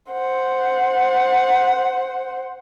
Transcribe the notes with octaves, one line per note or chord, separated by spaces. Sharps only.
C5 F#5